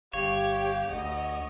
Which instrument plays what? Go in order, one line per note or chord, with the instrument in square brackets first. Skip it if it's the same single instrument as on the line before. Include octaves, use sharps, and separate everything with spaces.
[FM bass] G1 [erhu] G4 [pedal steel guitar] C#5 [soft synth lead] F5
[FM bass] D2 [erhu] D#5 [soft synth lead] F#5